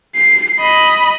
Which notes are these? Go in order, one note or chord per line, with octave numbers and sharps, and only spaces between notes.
C7
D#5 B5